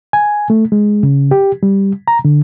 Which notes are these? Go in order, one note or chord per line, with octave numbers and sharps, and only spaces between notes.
G#5
A3
G#3
C#3
G4
G3
A#5
D3